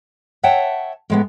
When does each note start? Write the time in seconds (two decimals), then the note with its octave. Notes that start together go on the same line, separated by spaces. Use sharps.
0.43 C#5 E5 F#5 G5 A5
1.10 A2 G#3 B3